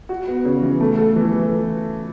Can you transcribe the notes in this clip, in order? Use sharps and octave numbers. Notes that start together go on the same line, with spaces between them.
F#4
B3
C#3
E3
A3
A4
E3
E3